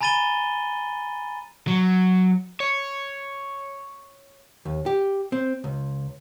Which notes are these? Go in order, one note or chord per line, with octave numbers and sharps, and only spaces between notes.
G#5 A#5 B5 A6 D#7 G7
F#3
C#5
D#2
G4
C4
C#2